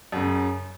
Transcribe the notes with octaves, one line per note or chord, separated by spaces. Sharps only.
F#2 C#3